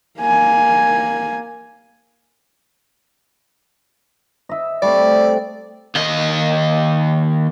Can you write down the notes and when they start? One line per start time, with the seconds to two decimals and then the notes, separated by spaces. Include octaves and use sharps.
0.20 A#3 G#5
4.49 D#5 E5
4.82 G3 A3 C4 D5
5.96 D#2 D#5